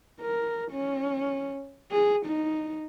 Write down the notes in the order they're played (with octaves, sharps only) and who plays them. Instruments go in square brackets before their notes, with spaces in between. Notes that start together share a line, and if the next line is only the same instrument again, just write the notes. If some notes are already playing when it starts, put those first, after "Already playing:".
[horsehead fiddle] A#4
C#4
G#4
D#4